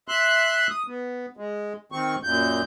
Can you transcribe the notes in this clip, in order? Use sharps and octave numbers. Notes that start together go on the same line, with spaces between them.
E5 C6 F#6
D#6
B3
G#3
D#3 C4 C#6
F#2 A#2 G6